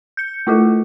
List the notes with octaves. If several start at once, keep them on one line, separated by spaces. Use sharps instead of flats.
G6 C#7
A3 E4 F4 A4